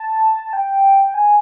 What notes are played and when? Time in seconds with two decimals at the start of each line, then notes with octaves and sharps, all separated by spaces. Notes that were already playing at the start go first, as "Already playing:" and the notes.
Already playing: A5
0.53 G5
1.14 G#5